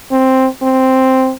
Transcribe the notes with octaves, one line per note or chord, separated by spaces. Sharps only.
C4
C4